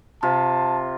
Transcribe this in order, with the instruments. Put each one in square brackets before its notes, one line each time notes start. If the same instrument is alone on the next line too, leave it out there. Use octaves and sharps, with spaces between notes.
[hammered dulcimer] C3 F4 [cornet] A5